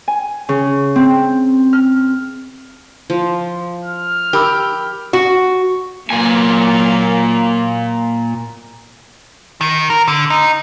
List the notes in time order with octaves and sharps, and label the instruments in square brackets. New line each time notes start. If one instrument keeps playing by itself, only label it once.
[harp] G#5
C#3
C4
F6
[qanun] F3
[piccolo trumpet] F6
[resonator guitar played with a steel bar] G4 [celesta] A#4 B5 E6
[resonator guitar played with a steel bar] F#4
[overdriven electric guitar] A#2 G#5 [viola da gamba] F#3 A#3
[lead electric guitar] D#3
A#4
D3
D#4